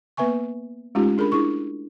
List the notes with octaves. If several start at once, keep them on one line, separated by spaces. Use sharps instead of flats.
A#3 B3 B4 E5 G#5 C#6
G#3 A3 C#4 D#4 F4 G4
D4 G#4 A#4 B5
D4 E4 G#4 C#6